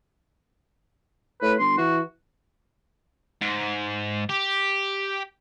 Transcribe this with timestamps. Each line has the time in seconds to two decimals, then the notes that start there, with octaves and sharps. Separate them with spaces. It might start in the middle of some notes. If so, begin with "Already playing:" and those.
1.42 A2 B4
1.59 G1 C6
1.78 E3 F#4
3.41 G#2
4.29 G4